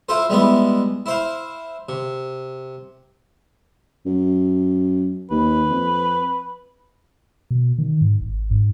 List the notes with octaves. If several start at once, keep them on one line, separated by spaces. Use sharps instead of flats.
E4 F4 A4 C5
G3 G#3 B3 E4
E4 C5 F5
C3
F#2
D#2 B4
F2
B2
D#3
G#2
G#1
G#2